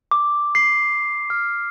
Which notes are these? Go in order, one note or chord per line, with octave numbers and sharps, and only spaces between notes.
D6
C7
F6